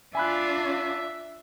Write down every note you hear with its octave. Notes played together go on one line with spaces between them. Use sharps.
D4 F4 E5 G#5 B5 F#6